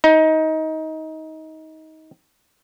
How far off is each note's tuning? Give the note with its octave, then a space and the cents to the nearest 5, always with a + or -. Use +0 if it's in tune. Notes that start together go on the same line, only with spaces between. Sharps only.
D#4 +20